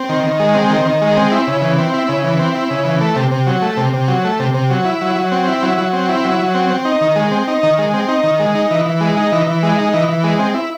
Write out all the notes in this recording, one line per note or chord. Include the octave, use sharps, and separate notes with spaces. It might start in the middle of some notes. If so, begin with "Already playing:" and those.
Already playing: C4
D#3
D#3
G#3
C4
D#3
D#3
G#3
C4
E4
C#3
E3
C4
E4
C#3
E3
C4
E4
C#3
E3
A3
C3
C3
F#3
A3
C3
C3
F#3
A3
C3
C3
F#3
E4
F#3
F#3
C4
E4
F#3
F#3
C4
E4
F#3
F#3
C4
C4
D#4
D#3
G#3
C4
D#4
D#3
G#3
C4
D#4
D#3
G#3
D#4
E3
E3
G#3
D#4
E3
E3
G#3
D#4
E3
E3
G#3
C4
E4